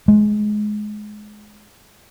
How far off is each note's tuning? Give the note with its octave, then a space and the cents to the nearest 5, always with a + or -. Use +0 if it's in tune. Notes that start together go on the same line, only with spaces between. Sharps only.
G#3 +20